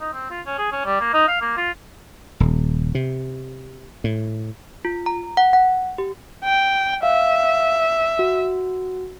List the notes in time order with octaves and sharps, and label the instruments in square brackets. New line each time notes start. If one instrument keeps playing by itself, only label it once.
[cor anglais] D#4
C4
F4
C#4
G#4
C#4
G3
A#3
D#4
F5
A#3
F4
[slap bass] D#1
C3
A2
[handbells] F4
A#5
F#5
F#5
G4
[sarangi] G5
[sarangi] E5 [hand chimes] F5
[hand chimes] F#4